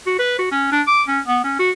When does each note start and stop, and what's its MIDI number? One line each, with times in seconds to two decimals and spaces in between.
0.07 0.15 66
0.19 0.37 71
0.39 0.50 66
0.52 0.67 61
0.72 0.82 62
0.87 1.03 86
1.08 1.20 61
1.26 1.40 59
1.44 1.55 61
1.59 1.71 66